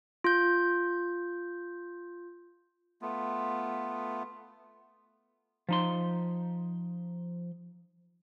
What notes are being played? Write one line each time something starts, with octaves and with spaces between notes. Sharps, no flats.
F4 G6
A3 B3 F4
F3 D#4 C6